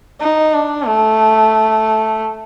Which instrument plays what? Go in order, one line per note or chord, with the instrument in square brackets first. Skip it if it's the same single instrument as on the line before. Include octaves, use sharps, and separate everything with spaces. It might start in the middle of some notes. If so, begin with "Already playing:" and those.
[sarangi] D#4
D4
A3